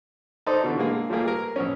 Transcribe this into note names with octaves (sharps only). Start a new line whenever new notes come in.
D#4 A4 C5 D5
B2 D3 E3
D3 G#3 A#3 G#4
F3 G3 A3 A#3 G#4
G#4 A#4
A#1 B3 C#4